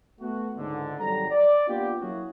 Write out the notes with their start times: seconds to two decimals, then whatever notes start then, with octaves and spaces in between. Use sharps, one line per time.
0.20 A3 B3 F#4
0.58 C#2 G#2 D3
0.99 G#1 F#3 G3 A4 A#5
1.30 D5
1.68 A#3 B3 D4 F4 G4
2.01 F#3 A#3 C#4 E4 F#4 G#4